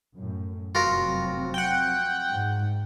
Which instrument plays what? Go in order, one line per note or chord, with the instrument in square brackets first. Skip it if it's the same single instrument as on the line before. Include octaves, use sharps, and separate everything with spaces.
[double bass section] F#2 A2
[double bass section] F1 F#3 C4 [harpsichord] F4 F#4 A#4
[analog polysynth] F#5 G5
[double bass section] G#2